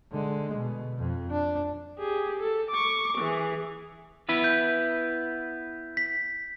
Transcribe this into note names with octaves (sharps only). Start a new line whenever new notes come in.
D3 G#3
B2
F2
D4
G4 G#4
A4
C#6 D6
E3 G#4
B3 E4 B4
G6
B6